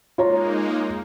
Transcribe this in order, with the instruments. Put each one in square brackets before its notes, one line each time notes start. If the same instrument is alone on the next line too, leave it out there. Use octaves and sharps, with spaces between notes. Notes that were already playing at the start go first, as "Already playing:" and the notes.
[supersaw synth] G#3 A#3 D#4 [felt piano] F4 C#5 A#5